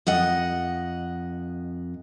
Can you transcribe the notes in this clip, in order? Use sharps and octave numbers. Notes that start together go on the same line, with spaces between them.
F2 D#5 F#5